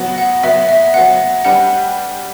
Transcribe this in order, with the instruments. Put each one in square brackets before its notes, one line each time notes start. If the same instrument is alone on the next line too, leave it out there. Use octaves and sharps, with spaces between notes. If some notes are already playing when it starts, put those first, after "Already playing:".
Already playing: [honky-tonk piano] F#3 B3 F#4
[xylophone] F#5
[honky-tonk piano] F#3 B3 F#4 [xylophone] E5
[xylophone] E5
[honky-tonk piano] F#3 B3 F#4 [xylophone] F#5
[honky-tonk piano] G3 D4 G4 B4 [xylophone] F#5